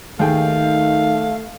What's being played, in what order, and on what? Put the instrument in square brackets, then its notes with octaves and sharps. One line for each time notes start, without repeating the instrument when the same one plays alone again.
[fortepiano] D#2 G#4 G5 [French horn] D#3 [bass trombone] A3 [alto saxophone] F5